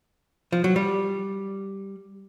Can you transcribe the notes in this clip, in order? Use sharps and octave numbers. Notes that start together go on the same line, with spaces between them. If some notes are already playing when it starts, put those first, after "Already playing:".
F3
F#3
G3